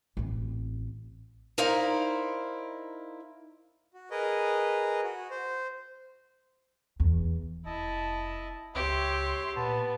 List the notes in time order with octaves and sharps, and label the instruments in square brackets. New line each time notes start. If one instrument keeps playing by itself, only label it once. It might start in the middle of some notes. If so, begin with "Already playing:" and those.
[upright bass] A1 C4
[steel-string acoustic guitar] D#4 E4 A#4 C5 D5 F5
[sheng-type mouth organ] F#4
G#4 A#4 B4 D#5
F#4
C5
[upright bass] E2
[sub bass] F1 [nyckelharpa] E4 [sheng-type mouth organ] D#5 A5
[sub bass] C#2 [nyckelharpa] G4 [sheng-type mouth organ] C#5 E5 [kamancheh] C6
[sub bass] A#2 [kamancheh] B3 [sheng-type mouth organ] A5